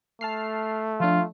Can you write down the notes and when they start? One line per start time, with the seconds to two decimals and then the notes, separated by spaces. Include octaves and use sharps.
0.21 A3 A5 F6 C7
1.00 F3 D4 F4